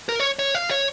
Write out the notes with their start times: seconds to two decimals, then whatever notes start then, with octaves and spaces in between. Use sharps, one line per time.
0.09 A#4
0.20 C#5
0.39 C#5
0.55 F5
0.71 C#5